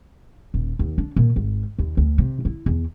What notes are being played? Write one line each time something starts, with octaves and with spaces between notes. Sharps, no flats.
D#1
D#2
D4
A#2
G#1
D#2
D2
C3
E4
E2